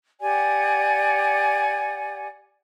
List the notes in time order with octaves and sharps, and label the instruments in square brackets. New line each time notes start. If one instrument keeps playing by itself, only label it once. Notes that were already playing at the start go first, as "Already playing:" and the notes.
[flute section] G4 D5 F#5 G#5